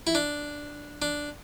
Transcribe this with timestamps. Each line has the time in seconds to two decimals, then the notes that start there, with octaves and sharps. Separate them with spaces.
0.07 E4
0.15 D4
1.02 D4